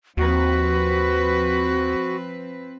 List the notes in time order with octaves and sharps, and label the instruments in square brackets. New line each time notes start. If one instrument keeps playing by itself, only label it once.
[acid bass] D#2 [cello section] F3 C4 B4 [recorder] F#4